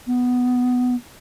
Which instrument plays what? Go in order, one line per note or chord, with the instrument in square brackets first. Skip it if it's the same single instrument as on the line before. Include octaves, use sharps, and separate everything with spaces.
[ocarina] B3